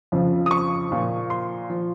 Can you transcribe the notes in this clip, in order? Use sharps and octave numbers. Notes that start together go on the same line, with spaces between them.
F2 C#3 F3
D#6
C#6
A#2 F3
C6
F3